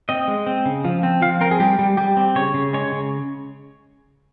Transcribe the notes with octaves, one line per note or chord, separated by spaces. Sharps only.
C4 D#5
G#3
C4
C#3
F3
C4
F3 F5
C4 A#4
G#4
G3 G4
G3
G3 G4
C4
C#3 C#5
C#3
G#3 C#5
C#3